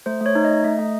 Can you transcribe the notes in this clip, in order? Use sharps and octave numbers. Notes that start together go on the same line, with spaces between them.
A3 C5
A3 C#5
D#4
A3 D#5
A3
A3